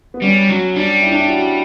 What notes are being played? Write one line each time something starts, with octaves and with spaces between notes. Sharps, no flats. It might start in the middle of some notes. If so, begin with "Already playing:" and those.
B3
G3 C#4
F#3 C#4
G3 D4
E4
D4
E4
F#4